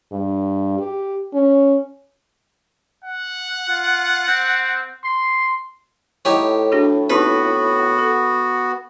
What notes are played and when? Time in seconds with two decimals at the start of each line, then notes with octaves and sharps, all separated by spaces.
0.11 G2
0.79 G4
1.33 C#4
3.04 F#5
3.69 F4
4.28 C4
5.05 C6
6.25 A2 D#4 G4 C#5 F#5
6.72 D4 F#4 G#4
7.10 B3 C4 D#4 F#4 G4 B4
7.98 A4